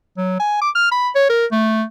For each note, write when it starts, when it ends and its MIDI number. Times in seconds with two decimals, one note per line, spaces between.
0.17 0.37 54
0.39 0.61 80
0.61 0.70 86
0.75 0.88 89
0.91 1.09 83
1.15 1.26 73
1.29 1.46 70
1.52 1.83 57